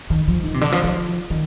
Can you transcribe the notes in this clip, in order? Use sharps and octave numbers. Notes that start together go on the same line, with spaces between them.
D#3
F3
D#3
C3
D3
F3
F3
D#3